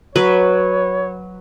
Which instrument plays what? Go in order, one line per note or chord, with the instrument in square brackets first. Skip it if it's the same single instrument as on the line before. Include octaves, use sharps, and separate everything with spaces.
[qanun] F#3 B4 [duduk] C#5